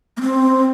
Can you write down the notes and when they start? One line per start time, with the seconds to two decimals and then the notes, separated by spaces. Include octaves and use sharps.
0.17 A#3
0.21 C4